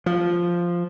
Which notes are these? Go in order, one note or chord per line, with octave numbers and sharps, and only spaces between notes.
F3